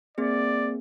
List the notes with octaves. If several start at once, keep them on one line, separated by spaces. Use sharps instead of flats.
A#3 C4 G#4 D5